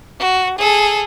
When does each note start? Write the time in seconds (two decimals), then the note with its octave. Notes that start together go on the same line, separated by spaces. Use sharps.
0.20 F#4
0.59 G#4 A4